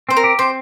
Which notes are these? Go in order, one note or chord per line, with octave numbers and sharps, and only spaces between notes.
C4 C5
A#4
G4
C4 C5